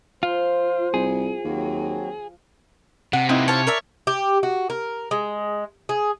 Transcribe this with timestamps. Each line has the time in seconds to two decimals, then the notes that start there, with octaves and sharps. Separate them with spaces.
0.23 F3 F4 C5
0.94 C2 G#4
1.44 D#2 F#3 C4 F#4 F5
3.13 C3 F#5
3.29 A#3 C4 D#4 E4 B4
3.48 C5 C#5 F5 A5
3.67 A#4 D5 E5
4.07 G4
4.43 F#4
4.70 A#4
5.11 G#3
5.89 G#4